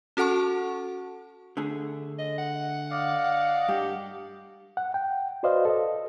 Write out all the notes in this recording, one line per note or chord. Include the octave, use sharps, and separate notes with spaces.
C#4 F#4 A4 F#5 A5 C#6
D3 A3 G#4
D#5
F#5
D5 D#5 F5
G2 G4
F#5
G5
F#4 B4 C5 D5 D#5 F5
A4 D#5